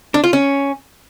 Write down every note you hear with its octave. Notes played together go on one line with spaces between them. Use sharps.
D4
F4
C#4